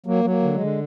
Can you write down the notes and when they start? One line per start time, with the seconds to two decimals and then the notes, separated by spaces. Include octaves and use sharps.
0.06 F#3 A#3
0.24 F#3
0.30 A#3
0.43 D3
0.54 G#3
0.61 D3